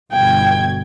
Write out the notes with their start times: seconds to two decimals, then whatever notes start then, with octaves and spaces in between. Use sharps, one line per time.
0.12 G1 B2 G5 G#6